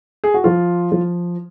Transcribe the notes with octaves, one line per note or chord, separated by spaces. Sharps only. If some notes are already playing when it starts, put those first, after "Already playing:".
G#4
F#4
F3 F4
F3